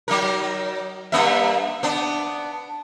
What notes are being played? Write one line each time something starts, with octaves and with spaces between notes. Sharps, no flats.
F#3 D#4 A#4
G2 A#3 E5
B3 D4